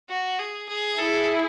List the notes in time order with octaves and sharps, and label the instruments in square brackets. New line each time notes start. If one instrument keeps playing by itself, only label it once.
[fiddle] F#4
G#4
G#4
[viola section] E4 G#4 [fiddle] A4